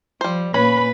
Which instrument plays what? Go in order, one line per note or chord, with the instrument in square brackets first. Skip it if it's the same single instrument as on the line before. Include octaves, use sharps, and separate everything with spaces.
[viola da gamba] F3 [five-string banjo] G3 C5
[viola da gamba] A#2 A#3 [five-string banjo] C#4 [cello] B4 [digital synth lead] B5